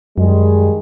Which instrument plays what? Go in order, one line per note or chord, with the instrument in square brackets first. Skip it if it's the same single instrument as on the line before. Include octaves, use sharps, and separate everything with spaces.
[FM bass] F#2 [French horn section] D#3 G3 G#3